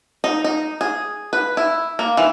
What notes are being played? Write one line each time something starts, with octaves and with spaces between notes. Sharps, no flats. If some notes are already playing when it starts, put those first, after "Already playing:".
D#4
D#4
G#4
B4
E4
A#3
E3